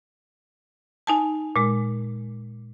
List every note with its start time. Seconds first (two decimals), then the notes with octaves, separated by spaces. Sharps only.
1.07 D#4 G#5 A5
1.56 A#2 G#3